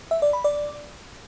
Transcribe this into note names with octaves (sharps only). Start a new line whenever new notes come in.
E5
D5
B5
D5